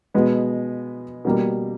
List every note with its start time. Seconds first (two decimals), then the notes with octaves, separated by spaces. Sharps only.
0.14 B2 G#3 B3
1.25 B2 G3 A#3